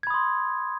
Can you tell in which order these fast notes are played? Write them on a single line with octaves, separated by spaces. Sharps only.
G#6 B5 D#6 C6